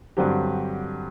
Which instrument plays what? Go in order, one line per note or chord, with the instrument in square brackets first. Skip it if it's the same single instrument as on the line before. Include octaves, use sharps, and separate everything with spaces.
[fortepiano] G2 D3 F#3 C4 G4